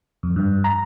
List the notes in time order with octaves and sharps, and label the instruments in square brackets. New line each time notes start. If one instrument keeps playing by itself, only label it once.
[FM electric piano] F2
G2
A#5